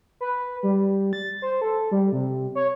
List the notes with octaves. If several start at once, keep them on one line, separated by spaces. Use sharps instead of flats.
B4
G3
A6
C5
A4
G3
C3
C#5